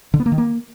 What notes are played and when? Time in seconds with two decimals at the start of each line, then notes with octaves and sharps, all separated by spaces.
0.14 D3
0.20 B3
0.26 A#3
0.32 D#3
0.38 A#3